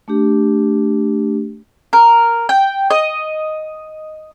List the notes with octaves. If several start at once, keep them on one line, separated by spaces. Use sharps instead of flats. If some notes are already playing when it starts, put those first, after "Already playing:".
A3 D4 G4
A#4
G5
D#5